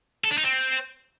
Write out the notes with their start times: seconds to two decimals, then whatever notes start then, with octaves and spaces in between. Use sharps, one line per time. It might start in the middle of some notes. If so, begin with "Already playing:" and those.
0.24 A4
0.31 D4
0.38 D#4
0.44 C4